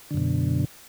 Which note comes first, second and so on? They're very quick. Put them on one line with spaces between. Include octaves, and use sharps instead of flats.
D3 F#2 B2